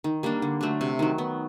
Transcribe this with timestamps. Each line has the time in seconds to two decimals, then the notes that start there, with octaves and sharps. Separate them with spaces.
0.04 D#3
0.23 G3 A#3 D4
0.42 D3
0.61 F#3 A3 D4
0.81 C3
0.99 D#3 F#3
1.18 B3